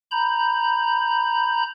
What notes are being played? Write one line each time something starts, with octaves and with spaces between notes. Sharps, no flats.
A#5 B5 G6